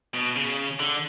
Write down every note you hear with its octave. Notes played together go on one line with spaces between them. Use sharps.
B2
C#3
D3